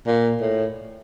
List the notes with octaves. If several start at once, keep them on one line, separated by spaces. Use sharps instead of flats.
A#2
A2